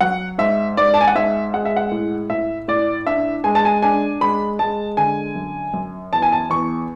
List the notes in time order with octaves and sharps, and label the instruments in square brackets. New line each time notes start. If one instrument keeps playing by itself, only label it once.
[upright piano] F#3 F#5
G#2 E5
G#2 D5
A5
G#5
F#5
G#2 E5
G#3 F#5
E5
F#5
A2
A2 E5
A2 D5
D4 E5
G#3 G#5
A5
G#5
D4 G#5
G#3 B5
G#3 A5
D3 G#5
F#2
F#2
E2 A5
G#5
A5
E2 C#6